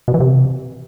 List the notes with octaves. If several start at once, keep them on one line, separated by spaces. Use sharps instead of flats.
B2
E3
C3